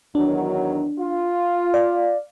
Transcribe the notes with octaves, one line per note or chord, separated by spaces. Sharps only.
E2 D#3 F#3 D4
F4
D5 F5